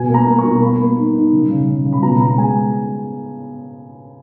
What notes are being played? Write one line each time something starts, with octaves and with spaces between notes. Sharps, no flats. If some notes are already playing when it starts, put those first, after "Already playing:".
Already playing: B2 G#5
A#3
A#5
A#3
C#6
B2
A#3 B5
A#3
D#4
D#4
C#3
C#3
C#3
C#3
B5
B2 A#5
B2 A#5
G#3 G#5